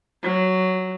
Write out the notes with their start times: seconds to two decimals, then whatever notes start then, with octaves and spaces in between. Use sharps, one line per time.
0.23 F#3